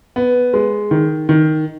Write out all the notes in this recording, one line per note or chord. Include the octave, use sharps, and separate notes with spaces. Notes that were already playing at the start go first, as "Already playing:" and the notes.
B3
G#3
D#3
D#3